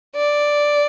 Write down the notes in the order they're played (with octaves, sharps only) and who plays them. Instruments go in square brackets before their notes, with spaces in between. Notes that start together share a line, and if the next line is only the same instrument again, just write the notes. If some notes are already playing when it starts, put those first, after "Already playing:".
[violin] D5